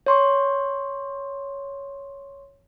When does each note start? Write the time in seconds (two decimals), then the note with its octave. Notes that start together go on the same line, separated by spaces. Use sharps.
0.06 C#5 C6 C#6